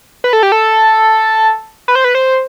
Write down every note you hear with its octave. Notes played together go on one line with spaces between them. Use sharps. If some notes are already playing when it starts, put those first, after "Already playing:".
B4
A4
G4
A4
B4
C5
B4
C5